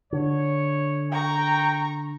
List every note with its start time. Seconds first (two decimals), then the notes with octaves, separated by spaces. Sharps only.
0.13 D3 C#5
1.12 G5 A#5 C#6